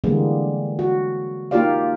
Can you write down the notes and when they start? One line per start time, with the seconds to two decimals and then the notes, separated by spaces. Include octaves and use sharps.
0.04 D3 E3 G3 G#3 A#3 B3
0.79 F#4
1.51 A#3 D#4 F4 G4 D5 F5